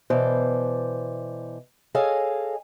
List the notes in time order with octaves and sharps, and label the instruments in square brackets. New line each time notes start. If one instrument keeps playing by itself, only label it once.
[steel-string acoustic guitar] B2 E3 C5 D5
G#4 A4 C#5 D#5 F5 G#5